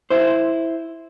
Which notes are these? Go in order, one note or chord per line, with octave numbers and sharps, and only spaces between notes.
E4 C5